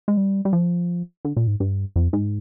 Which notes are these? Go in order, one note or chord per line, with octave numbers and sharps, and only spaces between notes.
G#3
G3
G3
F3
D3
A#2
G#2
G2
F2
G#2